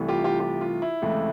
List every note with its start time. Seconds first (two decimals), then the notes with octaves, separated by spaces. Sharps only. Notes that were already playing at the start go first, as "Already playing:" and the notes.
Already playing: C2 C3 E3 A3
0.09 F4 G4
0.24 F4 G4
0.40 F4 G4
0.61 F4
0.82 E4
1.02 C#2 C3 E3 A3